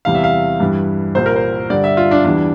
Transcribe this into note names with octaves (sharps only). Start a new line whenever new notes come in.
E2 C3 E3 G3 F5
E5
F5
G2 E3 G3
C2 A#2 G3 C5
A#4
C5
G2 D3 G3 D5
E5
F4
D4
E2 E3 G3 D4